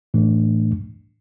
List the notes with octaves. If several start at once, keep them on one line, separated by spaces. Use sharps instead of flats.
A2 E3 A3 D4